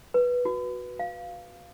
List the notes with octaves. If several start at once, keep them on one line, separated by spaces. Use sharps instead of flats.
B4
F#4
F5